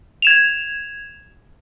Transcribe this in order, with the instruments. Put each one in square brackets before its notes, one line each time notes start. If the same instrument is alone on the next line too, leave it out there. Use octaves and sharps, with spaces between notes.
[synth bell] G#6 E7 F7